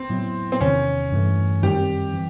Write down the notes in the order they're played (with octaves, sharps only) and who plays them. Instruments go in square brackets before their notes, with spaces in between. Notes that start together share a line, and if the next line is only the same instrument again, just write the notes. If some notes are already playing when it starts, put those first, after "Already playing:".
Already playing: [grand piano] C4
[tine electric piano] A2 F#3 B3 E4
[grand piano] C4
[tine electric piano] E2 C3 D#3 [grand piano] C#4
[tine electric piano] G2 E3 A3
[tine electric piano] F#2 D#3 G3 C4 [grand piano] G4
[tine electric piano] E3